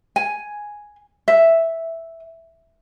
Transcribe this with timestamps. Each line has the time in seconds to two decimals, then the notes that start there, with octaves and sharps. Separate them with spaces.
0.16 G#5
1.28 E5